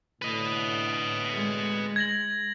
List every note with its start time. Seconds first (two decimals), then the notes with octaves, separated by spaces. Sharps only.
0.22 A2 D3 B4 D#5
1.33 G#3
1.96 G#6 A#6 F#7